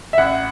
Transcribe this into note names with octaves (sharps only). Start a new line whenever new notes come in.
E5
A1 F#5